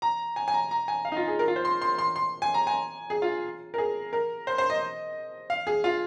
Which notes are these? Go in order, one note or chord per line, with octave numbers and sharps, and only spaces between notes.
A#5
G#5
G#5
A#5
A#5
G#5
F5
D#4
F4
G#4
A#4
F4
C5
C6
C6
C6
C6
G#5
A#5
G#5
G#4
F4
A#4
G#4
A#4
C5
C5
D#5
F5
G#4
F4